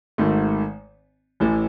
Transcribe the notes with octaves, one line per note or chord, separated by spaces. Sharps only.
G#1 G#2 D#3 A3
A1 A2 E3